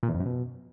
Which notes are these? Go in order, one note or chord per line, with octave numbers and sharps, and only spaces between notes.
A#2
E2
F2
F#2
B2